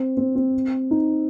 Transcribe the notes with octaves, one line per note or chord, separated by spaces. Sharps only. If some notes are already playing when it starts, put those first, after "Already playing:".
Already playing: C4
C4
C4
D#4